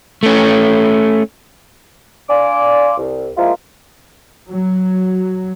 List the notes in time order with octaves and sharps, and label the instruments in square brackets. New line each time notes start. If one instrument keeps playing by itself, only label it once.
[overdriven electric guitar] A3 C#4
[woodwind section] D4 D5 F5 G#5 C6 D6
C2
F3 G#3 A#3 E4 F4
[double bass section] F#3